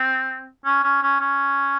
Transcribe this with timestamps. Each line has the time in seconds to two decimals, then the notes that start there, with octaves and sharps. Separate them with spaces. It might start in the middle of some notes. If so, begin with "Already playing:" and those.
Already playing: C4
0.65 C#4
0.83 C#4
1.02 C#4
1.20 C#4